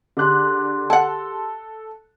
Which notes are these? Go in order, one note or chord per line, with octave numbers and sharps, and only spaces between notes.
D3 D4 G4 G#4 C6 F#6
A4 F#5 A5